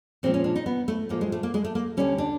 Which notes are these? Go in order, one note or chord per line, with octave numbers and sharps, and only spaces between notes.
A#2 F3 G#3 C4
C#4
D4
D#4
B3
A3
A2 F3 G#3 A#3
G#3
A3
A#3
G#3
A3
A#3
D2 D3 G3 C#4
D4